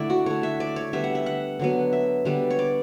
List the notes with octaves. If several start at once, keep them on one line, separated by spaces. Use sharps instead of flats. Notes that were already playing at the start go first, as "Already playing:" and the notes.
Already playing: D3 A3 E4 D5 E5 F#5
F#4
D3 A3 C#5
E5
D5
C#5
D3 G3 B3 E5
F#5
E5
F#5
D3 F#3 B3
E5
D3 G3 B3
C#5
D5